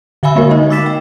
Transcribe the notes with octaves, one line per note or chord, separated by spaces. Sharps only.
D3 E5 F5 G#5 B5 E6
G#3 A#3 F#4 A#4
D#4 D#5
D6 E6 A6 B6 E7
G5